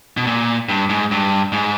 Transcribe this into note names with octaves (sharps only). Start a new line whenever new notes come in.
B2
A#2
G2
G#2
G2
G#2